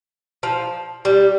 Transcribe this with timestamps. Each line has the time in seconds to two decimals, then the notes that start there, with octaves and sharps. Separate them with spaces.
0.43 F3
1.05 G3